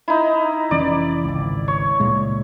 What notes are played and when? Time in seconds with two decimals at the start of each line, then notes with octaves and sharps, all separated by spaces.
0.08 D#4 E4
0.71 F1 E3 C#4 D5
1.24 G#1 C#2
1.68 C#5
2.00 C#2 A#2 G#3